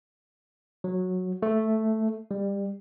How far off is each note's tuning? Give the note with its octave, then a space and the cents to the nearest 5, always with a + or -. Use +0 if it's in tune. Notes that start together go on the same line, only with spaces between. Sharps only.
F#3 -10
A3 +0
G3 +25